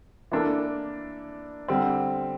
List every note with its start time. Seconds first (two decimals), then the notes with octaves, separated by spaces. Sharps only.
0.31 E3 A#3 D4 A4
1.68 D3 G3 C4